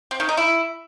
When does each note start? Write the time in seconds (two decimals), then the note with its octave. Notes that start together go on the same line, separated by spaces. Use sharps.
0.11 C4
0.20 D#3
0.29 D#4
0.37 E4